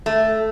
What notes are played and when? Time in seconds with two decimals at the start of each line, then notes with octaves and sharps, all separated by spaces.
0.06 A3